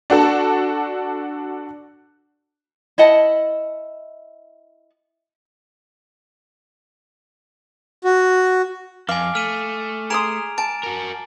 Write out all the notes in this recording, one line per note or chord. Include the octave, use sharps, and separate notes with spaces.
D4 F#4 A4 A5
E4 D#5 F#5 A5
F#4
F2 F5 G#5 D6
A3 F6 D#7
G#4 A#5 C6 D#6 D7 F7
G#5 A5 A6 D7
F#4 A#4